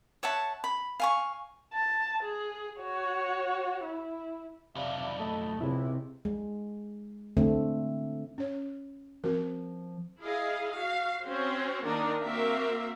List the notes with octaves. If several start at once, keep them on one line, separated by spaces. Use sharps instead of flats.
C#5 E5 F#5 A5
B5
F5 G#5 C#6
A5
G#4
F#4 C#5
E4
B1 F2 C3 D5 E5 F5
A3 D#5 A5
C#2 C3 E4
G#3
D3 A3 C4
C#4 C#5
F3 C4 F#4 A#4
E4 G#4 D#5 F5
F#4 F5
C4 C#4 F#4 C5
D#3 A#3 D4 D#4 A#4 D#5
A#3 C4 F#4 A#4 E5 F5